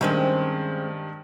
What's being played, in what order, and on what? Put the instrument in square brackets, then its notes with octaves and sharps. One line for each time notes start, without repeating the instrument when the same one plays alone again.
[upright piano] G2 D#3 [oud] G#3 C4 C#4